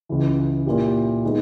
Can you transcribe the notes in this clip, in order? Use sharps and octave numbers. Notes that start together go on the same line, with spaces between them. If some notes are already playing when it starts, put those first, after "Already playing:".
C#2 C#3 E3
A#2 A#3 E4 G4
D#3 G#3 B3